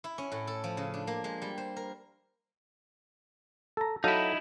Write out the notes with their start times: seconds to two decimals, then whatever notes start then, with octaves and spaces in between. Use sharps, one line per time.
0.04 E4
0.18 C#4
0.32 A2
0.47 A4
0.64 F3
0.77 C#3
0.94 D4
1.07 A#3
1.24 G#3
1.42 G3
1.58 C5
1.76 A#4
3.77 A4 A#5
4.04 F#3 D#4 E4 A4 F5